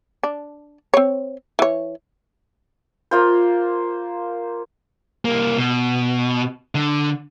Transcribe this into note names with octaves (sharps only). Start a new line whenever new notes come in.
D4
C4 C#5
E3 C#5
A#3 F4 C5
C2 A#3
B2
D3